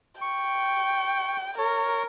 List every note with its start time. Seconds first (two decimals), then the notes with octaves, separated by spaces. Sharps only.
0.21 G5 C#6
1.58 A#4 C#5